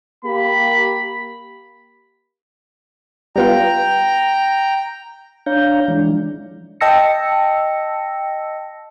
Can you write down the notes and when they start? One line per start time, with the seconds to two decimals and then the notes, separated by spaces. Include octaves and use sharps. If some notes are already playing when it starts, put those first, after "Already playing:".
0.25 A#3 G4 B5
3.36 G3 B3 F4 G5 A#5
5.46 D4 C#5 F5 A#5 G6
5.88 E3 F3 G#3 D4
6.81 D#5 G5 A5 E6 A#6 C#7